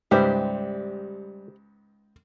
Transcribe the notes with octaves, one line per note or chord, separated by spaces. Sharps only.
C#2 G#2 G3 G4 B4 C5 E5